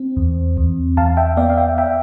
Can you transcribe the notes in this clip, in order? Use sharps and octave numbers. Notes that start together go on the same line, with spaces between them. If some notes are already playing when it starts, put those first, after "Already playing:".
Already playing: C4
E2
E2
E2 F5 A5
E5 G5
B3 D5 F5
F5
E5 G5
E5 G5